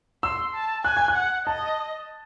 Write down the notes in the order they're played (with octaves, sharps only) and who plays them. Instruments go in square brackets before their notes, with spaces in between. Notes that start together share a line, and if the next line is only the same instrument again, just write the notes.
[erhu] C6 [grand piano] E6
[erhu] A5
[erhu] G#5 [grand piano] F#6
[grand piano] G#6
F#6
[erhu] F#5
[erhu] D#5 [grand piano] A5